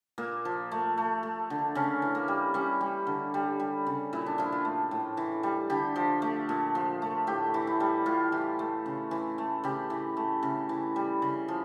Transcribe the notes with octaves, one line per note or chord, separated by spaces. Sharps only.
A#2 A#3
F3
A3
A3
A3
D3
C#3 C#4
E3
A#3
G3
G3 C#4
G3
D3
G3
G3
C#3
A#2 E4
D4
F3 E4
F4
A3
A2
E3
G3
D3 G4
F3
A3
A#2
F3
A3
A2 G4
E3
E4
G3
A2 F4
E3
A3
C#3
E3
A3
C#3 G4
E3
A3
C#3
E3
G3
C#3
F3